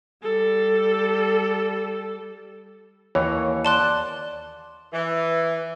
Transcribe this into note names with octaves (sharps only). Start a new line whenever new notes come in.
G3 A4
D#2 E3 C#5 A#5
D5 A5 C6 F#6
E3